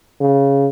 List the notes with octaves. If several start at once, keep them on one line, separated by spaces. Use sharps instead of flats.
C#3